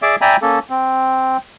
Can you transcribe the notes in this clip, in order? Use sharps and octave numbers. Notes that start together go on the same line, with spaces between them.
G#4 D5 E5 D6
D5 E5 G5 G#5 A#5 B5
A#3 C#4 A4
C4